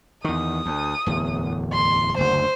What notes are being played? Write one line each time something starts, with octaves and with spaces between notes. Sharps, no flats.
E2 D#3 D#6
D2
D1 E2
C6
F#1 D2 C5